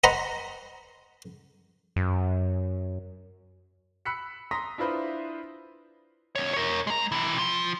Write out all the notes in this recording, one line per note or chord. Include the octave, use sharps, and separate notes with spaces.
C5 D#5 F#5 A#5 B5
F#2
B5 E6 F#6 B6 C#7
A#5 C6 D#6 A#6 B6
D4 E4 F4 B4 C5 E5
E2 C#5
A#4 C#5
G#3 A#5
C3 E3
F3